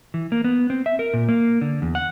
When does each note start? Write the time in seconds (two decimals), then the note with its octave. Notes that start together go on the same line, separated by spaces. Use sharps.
0.14 E3
0.32 A#3
0.44 B3
0.70 C4
0.86 E5
0.99 A#4
1.14 A#2
1.29 A#3
1.61 D3
1.82 E2
1.95 F#5